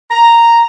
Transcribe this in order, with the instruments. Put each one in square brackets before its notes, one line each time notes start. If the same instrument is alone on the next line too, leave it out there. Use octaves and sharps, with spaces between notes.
[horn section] A#5